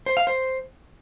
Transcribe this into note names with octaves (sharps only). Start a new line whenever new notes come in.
C5
F5
C5